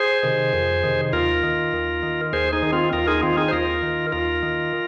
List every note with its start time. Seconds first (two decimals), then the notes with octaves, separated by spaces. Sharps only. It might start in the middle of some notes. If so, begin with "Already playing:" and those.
Already playing: G#4 C5
0.23 C3 D#3
0.53 F2
0.84 C3 D#3
1.13 D#2 F4 A#4
1.43 D#3
1.73 D#2
2.03 D#3
2.33 D#2 G#4 C5
2.53 D#4 G#4
2.63 D#3
2.72 C4 F4
2.93 D#2 F4 A#4
3.08 D#4 G#4
3.23 D#3 C4 F4
3.37 D#4 G#4
3.48 C5
3.52 D#2 F4 A#4
3.83 D#3
4.12 D#2 F4 A#4
4.43 D#3